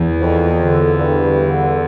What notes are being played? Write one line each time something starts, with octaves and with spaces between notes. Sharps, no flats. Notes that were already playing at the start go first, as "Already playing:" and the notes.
Already playing: E2 E3
F2
D3
G2
D3